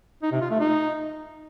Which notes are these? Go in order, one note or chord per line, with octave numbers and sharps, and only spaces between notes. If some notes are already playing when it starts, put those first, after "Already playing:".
D#4
C3
F4
A3
D#4